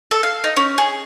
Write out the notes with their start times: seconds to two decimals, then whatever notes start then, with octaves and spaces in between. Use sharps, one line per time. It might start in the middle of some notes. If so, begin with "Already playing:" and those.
0.11 A4
0.23 F5
0.44 D#4
0.56 C#4
0.78 G#4